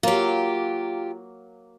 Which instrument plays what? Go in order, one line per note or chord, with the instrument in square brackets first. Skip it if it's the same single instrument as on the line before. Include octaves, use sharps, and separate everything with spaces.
[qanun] F#3 A#3 [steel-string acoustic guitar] F4 G4